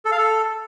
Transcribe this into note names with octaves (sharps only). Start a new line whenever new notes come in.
A4
F5
A4